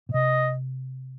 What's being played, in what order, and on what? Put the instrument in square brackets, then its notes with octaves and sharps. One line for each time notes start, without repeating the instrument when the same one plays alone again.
[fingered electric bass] A#2
[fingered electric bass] C3 [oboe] D#5